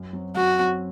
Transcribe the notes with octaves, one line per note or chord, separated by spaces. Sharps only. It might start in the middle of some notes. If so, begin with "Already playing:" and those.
Already playing: F#2
F#3 C4
F#2 F#4
F#3 C4